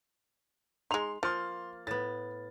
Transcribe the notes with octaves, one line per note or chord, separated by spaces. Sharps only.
G#3 D#4 C6 F7
F3 A#3 C6 F6 A6
A2 B3 A6